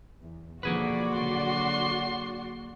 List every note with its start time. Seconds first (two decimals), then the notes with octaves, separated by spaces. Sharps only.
0.22 E2
0.63 B1 D3 F3 A#3 F#4 G#4 B4 D5
1.11 A#2 D3 F#3 C6